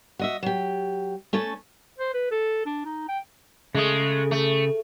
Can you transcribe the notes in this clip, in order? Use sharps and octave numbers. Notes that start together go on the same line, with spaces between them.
F#4 D#5 E5
F#3 G4
A3 C#4 A4 A5
C5
B4
A4
D4
D#4
G5
C#3 G#3 A3 D#6
A3